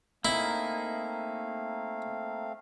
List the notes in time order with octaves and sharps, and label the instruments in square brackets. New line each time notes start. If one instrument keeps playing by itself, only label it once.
[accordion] A3 C4 F5 [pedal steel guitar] A#3 D#4 [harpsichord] E4